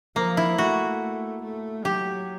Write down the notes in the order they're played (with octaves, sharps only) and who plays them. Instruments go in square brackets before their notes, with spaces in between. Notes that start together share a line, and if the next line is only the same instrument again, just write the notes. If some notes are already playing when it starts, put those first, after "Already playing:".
[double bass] F3 [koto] A#3
[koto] E4
[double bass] A3 [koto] F#4
[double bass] A3
[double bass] F#3 [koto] G4